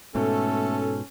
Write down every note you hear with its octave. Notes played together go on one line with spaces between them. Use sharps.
G#2 B2 A3 C#4 A4